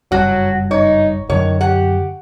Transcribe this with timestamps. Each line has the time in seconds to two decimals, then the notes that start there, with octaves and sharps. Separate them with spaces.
0.12 F#1 G2 F#3 F#4
0.71 D#4 C#5
1.30 F#2 D3 D#3 F#3 C#5
1.61 G4 F#5